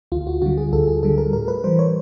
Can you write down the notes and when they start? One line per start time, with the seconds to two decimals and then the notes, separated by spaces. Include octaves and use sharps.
0.12 D2 F4
0.27 F#4
0.42 D3 G3 F#4
0.58 G#4
0.72 D2 A4
0.88 G#4
1.03 D3 G3 A4
1.18 A#4
1.33 A2 A#4
1.48 B4
1.64 E3 G3 C5
1.79 C#5